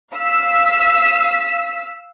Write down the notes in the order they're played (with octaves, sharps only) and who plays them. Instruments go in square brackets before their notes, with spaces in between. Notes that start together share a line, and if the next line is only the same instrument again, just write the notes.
[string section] F5 E6 B6